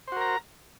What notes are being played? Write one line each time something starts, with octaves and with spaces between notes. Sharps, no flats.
F#4 A#4 C5 A#5